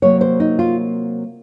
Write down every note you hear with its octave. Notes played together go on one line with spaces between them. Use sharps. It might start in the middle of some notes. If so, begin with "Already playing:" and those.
C3 F#3 A#3 C#5
C5
D#4
F4